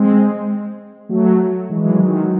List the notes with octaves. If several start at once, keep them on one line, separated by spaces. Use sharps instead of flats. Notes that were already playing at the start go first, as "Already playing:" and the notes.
Already playing: G#3 C4
F#3 A3
E3 G#3
D#3 F#3
D#3 F#3